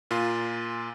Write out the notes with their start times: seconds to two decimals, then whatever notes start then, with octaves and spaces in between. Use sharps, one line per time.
0.11 A#2 F4 C6